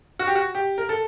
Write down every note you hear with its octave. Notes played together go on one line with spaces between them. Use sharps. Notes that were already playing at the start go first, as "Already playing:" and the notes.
F#4
G4
F#4
G4
A#4
A4